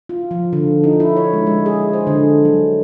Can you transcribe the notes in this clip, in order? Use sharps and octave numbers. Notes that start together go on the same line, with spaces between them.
F4
F3
D3
D#4
E4
C#5
G#3
G#3
G#4
C5
D3
F#3